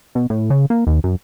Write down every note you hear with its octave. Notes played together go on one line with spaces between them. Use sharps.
B2
A2
C#3
A#3
D#2
F#2